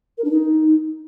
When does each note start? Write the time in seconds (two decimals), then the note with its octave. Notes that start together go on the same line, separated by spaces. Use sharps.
0.18 A#4
0.24 D4
0.31 D#4